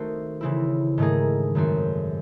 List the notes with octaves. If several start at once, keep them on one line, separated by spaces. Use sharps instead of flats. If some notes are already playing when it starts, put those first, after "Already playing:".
Already playing: D#3 A3 C4 D#4 F#4 C5
C#3 E3 C4 E4
G#2 D#3 A3 D#4 G#4
F#2 D#3 A3 C4 F#4